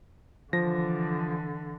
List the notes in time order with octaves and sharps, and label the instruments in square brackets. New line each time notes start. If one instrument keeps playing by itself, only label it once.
[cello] D3 E3 [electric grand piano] F3 A#6